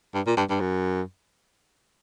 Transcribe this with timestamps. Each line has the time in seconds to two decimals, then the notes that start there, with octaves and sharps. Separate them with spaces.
0.14 G2
0.27 A#2
0.37 G2
0.50 G2
0.60 F#2